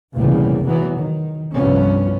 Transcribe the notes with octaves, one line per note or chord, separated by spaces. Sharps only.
F1 A#1 E2 C#3 G3
E2 E3 F#3 B3
D#3
C2 G2 F3 B3 C#4